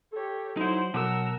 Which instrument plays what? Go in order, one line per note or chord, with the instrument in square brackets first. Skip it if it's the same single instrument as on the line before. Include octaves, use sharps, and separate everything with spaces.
[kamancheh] G4 C#5 [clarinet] A4
[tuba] F#3 [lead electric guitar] D#4 E4 [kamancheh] C5 F#5
[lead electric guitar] B2 [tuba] F#3 [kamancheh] A#4 E6 [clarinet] F#5